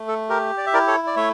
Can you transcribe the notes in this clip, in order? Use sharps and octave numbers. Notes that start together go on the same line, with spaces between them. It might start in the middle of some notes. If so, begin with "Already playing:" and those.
Already playing: A3
A4
G4 A#4
D5
E5
E4 A#4 D5
A4 C#5
D5
A3 C#5 E5